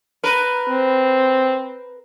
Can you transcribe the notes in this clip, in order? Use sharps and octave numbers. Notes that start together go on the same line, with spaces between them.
A#4 B4
C4